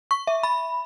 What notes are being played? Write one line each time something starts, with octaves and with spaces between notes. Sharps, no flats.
C#6
E5
B5